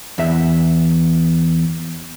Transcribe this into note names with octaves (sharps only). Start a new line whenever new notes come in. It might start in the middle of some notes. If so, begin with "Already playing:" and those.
E2 E5